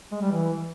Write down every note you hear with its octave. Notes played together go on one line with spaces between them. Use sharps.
G#3
G3
E3